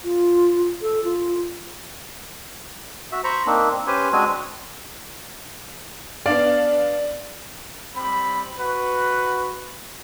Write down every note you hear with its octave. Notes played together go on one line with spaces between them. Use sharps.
F4
A4
F4
F#4 E5
C5 A#5 B5 C#6
A#3 C4 D4 D#4
C4
C#4 G4 B4 C5 G#5
G#3 C4 D4 F#4 G#5
B3 D4 D5 F5
G3 C4 B5
F#4 B4